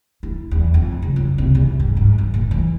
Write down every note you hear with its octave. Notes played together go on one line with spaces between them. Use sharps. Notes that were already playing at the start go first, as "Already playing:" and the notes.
E4
E2
F2
C#2
F#1
C2
E2
G#2
G#2
F#2
A#2
E3